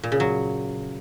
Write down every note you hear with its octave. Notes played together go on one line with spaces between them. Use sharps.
A#2
C#3
F#3